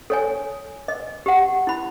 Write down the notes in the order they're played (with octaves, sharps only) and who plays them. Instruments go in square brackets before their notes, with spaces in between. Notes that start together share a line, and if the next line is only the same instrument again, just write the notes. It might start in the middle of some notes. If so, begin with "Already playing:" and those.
[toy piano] A4 C#5 G#5
D#5
G4 F#5
E4 B5